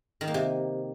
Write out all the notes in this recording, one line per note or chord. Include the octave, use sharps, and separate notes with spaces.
D#3
A#3
C3